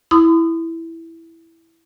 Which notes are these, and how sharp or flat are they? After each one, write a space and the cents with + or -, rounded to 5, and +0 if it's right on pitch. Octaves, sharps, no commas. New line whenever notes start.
E4 +0 B5 +45 D#6 -20